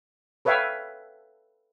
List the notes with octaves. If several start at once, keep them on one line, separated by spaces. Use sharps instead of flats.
A4 B4 C#5 E5 F5 G5